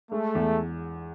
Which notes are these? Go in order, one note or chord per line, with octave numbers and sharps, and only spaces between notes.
G#3 A3
E2